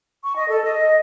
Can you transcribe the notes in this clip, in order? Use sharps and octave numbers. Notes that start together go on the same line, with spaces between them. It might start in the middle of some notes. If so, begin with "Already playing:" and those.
C#6
D#5
A4
D#5